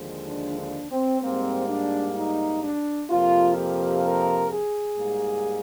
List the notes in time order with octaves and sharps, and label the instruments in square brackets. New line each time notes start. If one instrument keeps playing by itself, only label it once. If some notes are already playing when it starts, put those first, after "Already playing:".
Already playing: [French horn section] D#2 D3 F3 G#3
D4
D4
C4
G#2 G3 A#3 C4
D4
D#4
D4
F2 C3 F3 A#3 F4
G4
A#4
G#4
G#2 G3 A#3